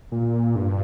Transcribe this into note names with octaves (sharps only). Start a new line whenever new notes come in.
A#2
G2